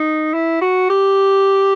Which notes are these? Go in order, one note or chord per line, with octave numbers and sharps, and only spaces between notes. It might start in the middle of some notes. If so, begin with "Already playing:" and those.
Already playing: D#4
E4
F#4
G4